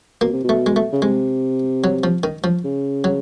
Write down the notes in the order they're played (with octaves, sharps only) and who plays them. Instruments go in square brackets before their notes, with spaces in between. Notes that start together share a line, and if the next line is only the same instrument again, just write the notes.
[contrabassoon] B2 [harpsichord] A#3
[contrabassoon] C3
B2
[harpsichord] A3
G#3
A3
[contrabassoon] C#3
[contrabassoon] C3 [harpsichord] G#3
[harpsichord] F#3
F3
D#3
F3
[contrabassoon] C#3
[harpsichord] F#3